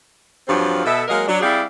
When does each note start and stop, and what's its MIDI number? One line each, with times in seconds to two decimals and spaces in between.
0.48 0.83 43
0.48 0.83 53
0.48 0.83 54
0.48 0.83 60
0.48 0.83 65
0.85 1.04 47
0.85 1.04 69
0.85 1.04 76
1.08 1.26 54
1.08 1.26 56
1.08 1.26 58
1.08 1.26 70
1.08 1.26 75
1.08 1.26 77
1.28 1.41 54
1.28 1.41 62
1.41 1.63 55
1.41 1.63 60
1.41 1.63 64
1.41 1.63 68
1.41 1.63 74
1.41 1.63 77